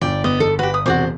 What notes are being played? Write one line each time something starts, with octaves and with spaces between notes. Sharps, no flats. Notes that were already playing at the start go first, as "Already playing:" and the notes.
G1 D5 G5
B3 D#5
A4
F#4 G4 B4
D#6
E1 C3 F#4 C5 D5 D6